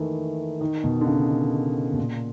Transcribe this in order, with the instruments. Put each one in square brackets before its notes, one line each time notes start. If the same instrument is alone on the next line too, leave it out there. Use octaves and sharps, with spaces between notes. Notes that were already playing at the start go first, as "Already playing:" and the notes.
Already playing: [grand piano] D#3 E3 A3 A#3
D#3
B2
D3
C#3
B2
A#2